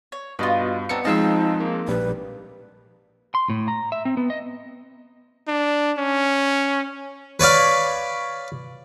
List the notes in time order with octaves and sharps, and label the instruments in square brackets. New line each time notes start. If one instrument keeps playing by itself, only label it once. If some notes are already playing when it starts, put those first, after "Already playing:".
[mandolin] C#5
[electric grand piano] G2 [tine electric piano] B3 F#4 D#5 [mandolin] F4 B4
[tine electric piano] B3 C#7 [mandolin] C4 D4 D#4
[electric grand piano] F3 G#3 C4 [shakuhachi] D#4 [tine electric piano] D#5 F5 E6 [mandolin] A5
[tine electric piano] A#3
[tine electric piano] A#1 G3 [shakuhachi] B4
[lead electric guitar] C6
A2
A#5
E5
C4
B3
D#5
[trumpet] D4
C#4
[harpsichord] B4 C#5 D5 F5